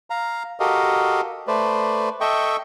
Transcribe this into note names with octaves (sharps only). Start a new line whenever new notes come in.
F5 A#5
F#4 G4 A4 A#4 D#5 F5
A3 B4 C5 D5
A4 D#5 E5 G5 C#6